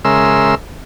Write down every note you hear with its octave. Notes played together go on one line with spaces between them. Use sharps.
C#3 G#3 A#4 E5 C6 E6